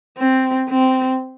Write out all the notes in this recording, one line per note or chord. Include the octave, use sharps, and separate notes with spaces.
C4
C4